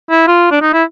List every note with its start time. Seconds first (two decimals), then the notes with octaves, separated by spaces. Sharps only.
0.10 E4
0.27 F4
0.51 D4
0.62 D#4
0.73 E4